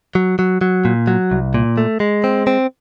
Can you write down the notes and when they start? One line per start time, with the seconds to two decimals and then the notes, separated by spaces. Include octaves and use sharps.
0.15 F#3
0.39 F#3
0.61 F#3
0.85 A#2
1.07 F#3
1.31 C2
1.54 A#2
1.77 A3
2.00 G#3
2.24 C4
2.47 C4